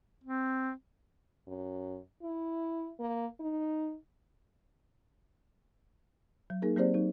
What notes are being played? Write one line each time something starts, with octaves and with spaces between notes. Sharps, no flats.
C4
F#2
E4
A#3
D#4
F#3
A#3 D#4 G#4 A#4
F#3 A#3 C4 G4 C5 D5
F#3 D#4